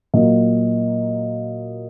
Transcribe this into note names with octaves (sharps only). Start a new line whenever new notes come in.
A#2 F#3 A#3 D#5